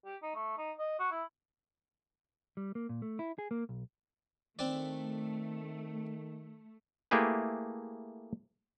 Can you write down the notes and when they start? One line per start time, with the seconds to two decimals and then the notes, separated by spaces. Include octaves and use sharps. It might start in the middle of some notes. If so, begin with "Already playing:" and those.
0.05 G4
0.22 D#4
0.35 A3
0.58 D#4
0.78 D#5
0.99 F#4
1.11 E4
2.57 G3
2.75 A#3
2.89 A#2
3.02 A3
3.19 E4
3.39 G#4
3.51 A#3
3.69 B1
4.59 D#3 A3 C4 D4 D5
7.11 A3 A#3 E4 G4 G#4 B4